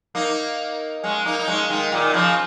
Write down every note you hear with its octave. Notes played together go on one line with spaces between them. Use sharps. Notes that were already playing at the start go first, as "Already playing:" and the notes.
A#3 D#4
G#3 C#4
A#3 D#4
D#4
G#3 C#4
D#3 G#3
A#2 D#3
C#3 F3